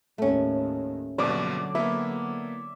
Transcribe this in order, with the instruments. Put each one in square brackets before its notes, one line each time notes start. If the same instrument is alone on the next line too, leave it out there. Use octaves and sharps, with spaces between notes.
[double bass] D#2 A2 [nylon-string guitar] A3 C#4
[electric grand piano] A#1 G2 B2 [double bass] D3 F#3 [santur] D5
[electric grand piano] A#3 B3 E4 [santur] E5